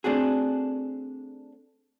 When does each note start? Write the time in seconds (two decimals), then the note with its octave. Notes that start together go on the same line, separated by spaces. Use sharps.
0.04 A3 C4 D4 F#4 G#4